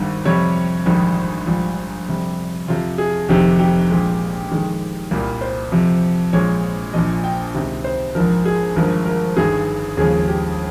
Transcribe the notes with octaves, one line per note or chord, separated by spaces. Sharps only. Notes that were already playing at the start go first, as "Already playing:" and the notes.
Already playing: G#1 G2 D#3 G3
F2 C3 G3 C#5
A#1 G#2 D#3 G3
A#1 G#2 G3 F4
F2 C3 G3
F2 C3 F3 F4
G#4
F1 F2 C3 D#3 G4
G4
A#1 A#2 G#3
F2 D#3 G#3
C2 A#2 G3 A#4
C5
F2 C3 F3
A#1 A#2 G#3 C#5
A#1 A#2 F3 D#5
G5
C#2 C3 D#3
C5
A#1 G#2 F3 A#4
G#4
G#1 G2 F3 G#3 A#4
A#4
G1 G2 D#3 G#4
D#2 C#3 F3 G#3 G#4
G4